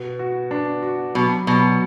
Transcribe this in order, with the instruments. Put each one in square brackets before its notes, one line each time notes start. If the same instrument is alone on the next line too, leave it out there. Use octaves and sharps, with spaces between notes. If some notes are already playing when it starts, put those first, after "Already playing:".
Already playing: [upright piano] B2
F#4
D4
F#4
[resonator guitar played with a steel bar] B2 [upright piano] F#3
[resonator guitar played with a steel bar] B2 [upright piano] F#3